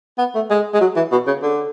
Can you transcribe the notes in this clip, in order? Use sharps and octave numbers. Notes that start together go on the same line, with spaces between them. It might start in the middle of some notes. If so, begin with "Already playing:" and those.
B3
A3
G#3
G#3
F#3
E3
B2
C#3
D3